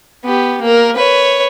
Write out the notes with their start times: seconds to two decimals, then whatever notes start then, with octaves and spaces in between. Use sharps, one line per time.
0.25 B3 G4
0.62 A#3 A#4
0.96 B4 C#5